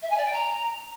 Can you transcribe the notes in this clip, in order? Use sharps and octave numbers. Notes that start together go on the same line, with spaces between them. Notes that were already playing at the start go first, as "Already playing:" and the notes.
E5
G#5
D5
G5
A#5